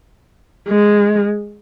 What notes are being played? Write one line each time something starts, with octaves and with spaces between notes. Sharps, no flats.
G#3